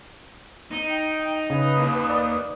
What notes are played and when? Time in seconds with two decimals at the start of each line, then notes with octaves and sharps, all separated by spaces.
0.71 D#4
0.90 G5
1.50 C#3 B4 D#6
1.76 D#2
2.09 D5